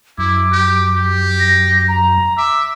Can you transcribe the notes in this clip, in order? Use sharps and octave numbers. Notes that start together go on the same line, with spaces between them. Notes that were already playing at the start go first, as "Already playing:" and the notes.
F#2 E4 D6
G4
G4
A#6
A#5
E5 D6